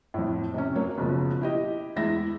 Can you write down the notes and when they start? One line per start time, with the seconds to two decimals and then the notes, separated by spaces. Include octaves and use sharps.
0.14 F2 A2
0.54 C3 C#4
0.75 F#3 A#3 C#5
0.98 F#1 B2 F3
1.41 E4 G4 D#5
1.96 E2 G#3 E4 E5 A#6